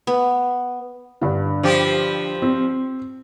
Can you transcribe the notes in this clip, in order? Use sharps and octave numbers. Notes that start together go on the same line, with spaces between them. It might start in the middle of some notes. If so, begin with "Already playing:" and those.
B3
G2 D3
F3 F4 G4
C4